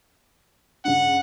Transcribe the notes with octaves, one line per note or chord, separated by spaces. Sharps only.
G2 C#3 F#5